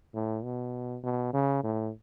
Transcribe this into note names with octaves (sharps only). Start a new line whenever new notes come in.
A2
B2
B2
C#3
A2